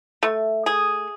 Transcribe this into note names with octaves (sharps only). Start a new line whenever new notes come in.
A3
G#4